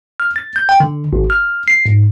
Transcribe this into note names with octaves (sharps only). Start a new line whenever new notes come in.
F6
A6
G6
G5
D3
G#1
F6
C7
G#2